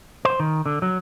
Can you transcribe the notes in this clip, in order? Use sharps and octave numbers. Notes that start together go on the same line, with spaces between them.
C5
D#3
D3
F#3